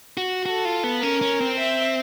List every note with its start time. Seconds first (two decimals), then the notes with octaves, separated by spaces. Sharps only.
0.17 F#4
0.46 F#4 A4
0.65 F4
0.84 B3
1.02 C#4 A#4
1.21 C#4
1.41 C4
1.59 E5